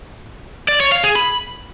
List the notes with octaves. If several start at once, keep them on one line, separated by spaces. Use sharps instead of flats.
D5
C#5
F5
G#4
B5